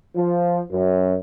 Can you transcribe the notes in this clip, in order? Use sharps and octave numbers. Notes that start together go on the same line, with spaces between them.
F3
F#2